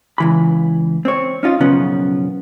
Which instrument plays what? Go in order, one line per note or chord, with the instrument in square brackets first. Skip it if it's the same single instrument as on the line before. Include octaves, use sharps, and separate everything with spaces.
[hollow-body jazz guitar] C#2 E3 B5
C4 C#5
C#4 D#4 F4
B1 F#2 C#3 F3 B3 C#4